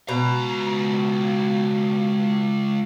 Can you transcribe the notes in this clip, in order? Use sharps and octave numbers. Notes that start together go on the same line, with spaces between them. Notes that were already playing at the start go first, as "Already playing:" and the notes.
C#2 B2 A#5